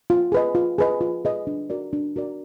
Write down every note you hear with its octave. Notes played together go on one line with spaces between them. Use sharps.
F4
G#4 B4 D#5
F4
G#4 B4 D#5
F4
G#4 B4 D#5
D4
F#4 A#4 D5
D4
F#4 A#4 D5